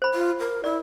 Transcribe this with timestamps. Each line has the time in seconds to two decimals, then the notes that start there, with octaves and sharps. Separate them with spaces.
0.02 C5 B5
0.14 F4
0.40 A#4
0.64 E4 D5